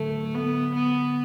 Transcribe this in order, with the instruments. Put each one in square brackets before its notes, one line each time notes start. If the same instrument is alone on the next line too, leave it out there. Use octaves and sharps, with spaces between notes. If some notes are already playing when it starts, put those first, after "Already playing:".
Already playing: [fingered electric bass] D3 F#3 [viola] A3
[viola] B3
B3